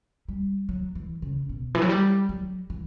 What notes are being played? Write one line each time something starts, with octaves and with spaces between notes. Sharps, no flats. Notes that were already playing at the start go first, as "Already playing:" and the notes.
G3
F#3
E3
C#3
B2
E3
F#3
G3
F#3
E3